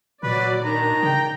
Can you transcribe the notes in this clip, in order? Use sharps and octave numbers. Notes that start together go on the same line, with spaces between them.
A#2 F#3 B4 D5
D#3 D4 A#5
C#3 G5